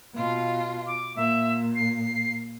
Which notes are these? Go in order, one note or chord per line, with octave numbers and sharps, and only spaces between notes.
B2 F4
D6
A#2 E5
C7